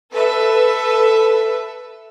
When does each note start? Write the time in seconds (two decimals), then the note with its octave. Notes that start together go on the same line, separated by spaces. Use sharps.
0.13 A4 B4 E5